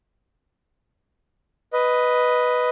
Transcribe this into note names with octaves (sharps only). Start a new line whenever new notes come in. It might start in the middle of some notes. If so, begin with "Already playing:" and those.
B4 D#5